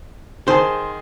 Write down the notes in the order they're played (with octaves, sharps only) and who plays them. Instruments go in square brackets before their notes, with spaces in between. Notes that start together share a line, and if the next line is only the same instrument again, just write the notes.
[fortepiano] D#3 G#4 A5 [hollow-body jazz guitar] C5